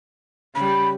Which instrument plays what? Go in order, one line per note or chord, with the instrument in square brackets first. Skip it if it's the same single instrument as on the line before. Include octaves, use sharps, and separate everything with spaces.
[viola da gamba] C#3 G3 [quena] B5